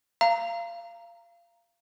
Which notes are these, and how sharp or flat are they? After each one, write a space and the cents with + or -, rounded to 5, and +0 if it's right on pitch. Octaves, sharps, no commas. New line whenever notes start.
F5 -25 A#5 +0